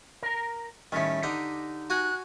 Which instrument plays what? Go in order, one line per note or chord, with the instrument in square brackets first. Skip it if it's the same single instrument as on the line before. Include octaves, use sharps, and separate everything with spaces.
[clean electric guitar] A#4 A#5
[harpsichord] A2 D#3 [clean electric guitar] G3 C#4
[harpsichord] D3 D#5 [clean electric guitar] D#4 G4
[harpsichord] F#4 G#5 A#5 [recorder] F#6